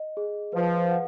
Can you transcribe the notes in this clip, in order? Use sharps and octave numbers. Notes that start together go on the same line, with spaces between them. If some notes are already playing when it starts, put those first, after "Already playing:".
Already playing: D#5
G#4
F3 B4
F#5